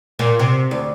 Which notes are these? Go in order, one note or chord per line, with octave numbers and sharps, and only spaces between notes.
A#2
C3
D2